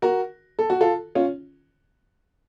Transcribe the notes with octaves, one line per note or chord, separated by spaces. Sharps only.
F#4 A#4
A4
F#4
F4 A4
C#4 F4